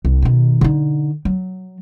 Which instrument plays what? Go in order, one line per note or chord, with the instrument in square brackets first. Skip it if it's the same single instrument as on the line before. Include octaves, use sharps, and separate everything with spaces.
[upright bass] C2
B2 D#3
D3 D#4
F#3